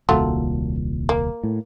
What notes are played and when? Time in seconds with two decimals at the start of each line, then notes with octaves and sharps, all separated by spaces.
0.09 D#1 C2 A#2 F#3 A3 F4
1.09 A#3
1.44 A2